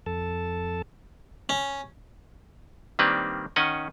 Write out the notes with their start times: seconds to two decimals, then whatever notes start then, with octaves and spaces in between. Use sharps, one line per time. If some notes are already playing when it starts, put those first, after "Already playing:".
0.06 F2 A4 A5
1.49 C#4
2.99 D#3 G3 A#3 C4 D4 B4
3.56 D#3 C#4 D#5 F#5